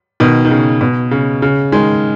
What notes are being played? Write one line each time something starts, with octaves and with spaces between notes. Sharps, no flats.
B2 D#3
D#3
C#3
B2
C#3
C#3
D#3 G#3